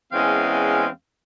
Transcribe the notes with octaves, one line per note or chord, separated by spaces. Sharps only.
E2 G#3 C4 C#4 F5